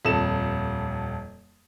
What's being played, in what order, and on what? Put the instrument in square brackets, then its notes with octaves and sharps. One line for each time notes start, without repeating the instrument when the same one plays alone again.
[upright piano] D#1 F2 A4 E7